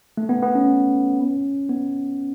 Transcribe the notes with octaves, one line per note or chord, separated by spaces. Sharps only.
A3
B3
B3
C#4
B3